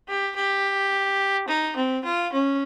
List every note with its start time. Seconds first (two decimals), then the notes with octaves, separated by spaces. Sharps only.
0.09 G4
0.36 G4
1.48 D#4
1.76 C4
2.05 F4
2.33 C#4